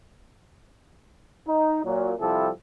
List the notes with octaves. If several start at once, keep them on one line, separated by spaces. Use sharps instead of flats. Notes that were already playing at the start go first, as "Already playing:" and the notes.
D#4
A#2 F#3
C3 F3 G3 E4 G4 A4